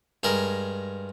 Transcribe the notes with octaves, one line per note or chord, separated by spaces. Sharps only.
G2 G#3 A#4